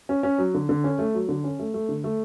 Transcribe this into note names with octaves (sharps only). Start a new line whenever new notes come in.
C#4
C#4
F#3
D3
D3
C#4
A3
F#3
D3
C#4
A3
A3
D3
A3